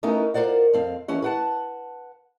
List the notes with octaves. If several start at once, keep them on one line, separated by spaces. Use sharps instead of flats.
A3 B3 C#4 D#4 E4 A#4
F4 A#4 C5 D5 F#5
F2 C4 F5
D#2 E3 C#4 F#5
B4 F#5 A5